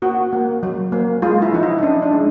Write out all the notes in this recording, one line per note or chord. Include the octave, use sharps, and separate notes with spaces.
A#3 F#4
A#3
F#3
A#3
G#3 F4
E4
F3 D#4
E4
D#4
C#4 D4
D4
G#3